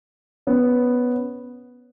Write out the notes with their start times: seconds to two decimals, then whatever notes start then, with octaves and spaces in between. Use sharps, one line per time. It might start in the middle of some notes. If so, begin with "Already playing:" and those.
0.47 B3 C#4